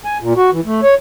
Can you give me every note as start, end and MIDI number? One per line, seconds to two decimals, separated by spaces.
0.05 0.18 80
0.21 0.33 46
0.37 0.50 66
0.52 0.60 52
0.66 0.81 57
0.83 0.94 73